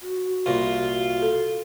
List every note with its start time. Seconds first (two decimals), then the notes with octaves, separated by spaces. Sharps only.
0.01 F#4
0.46 C2 A#2 F4
1.22 A4